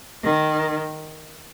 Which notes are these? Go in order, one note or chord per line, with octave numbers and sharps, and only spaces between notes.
D#3